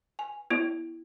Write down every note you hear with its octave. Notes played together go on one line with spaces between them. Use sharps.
G#5
B3 E4